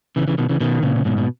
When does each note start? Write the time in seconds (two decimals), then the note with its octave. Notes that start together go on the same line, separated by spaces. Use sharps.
0.16 C#3 E3
0.28 C#3 E3
0.38 B2 D#3
0.49 C#3 E3
0.60 B2 D#3
0.83 A#2 C#3
0.96 C#3
1.05 G#2 B2
1.18 B2